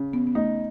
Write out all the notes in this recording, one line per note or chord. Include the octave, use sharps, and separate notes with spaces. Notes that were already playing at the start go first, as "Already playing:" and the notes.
Already playing: C#3
B3
B3
A3 D#4